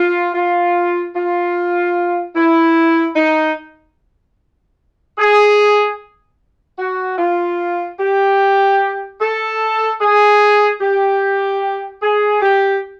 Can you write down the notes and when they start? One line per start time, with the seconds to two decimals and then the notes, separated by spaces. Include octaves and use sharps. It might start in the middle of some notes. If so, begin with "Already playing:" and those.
Already playing: F4
0.34 F4
1.15 F4
2.36 E4
3.16 D#4
5.18 G#4
6.79 F#4
7.18 F4
8.00 G4
9.21 A4
10.01 G#4
10.81 G4
12.02 G#4
12.42 G4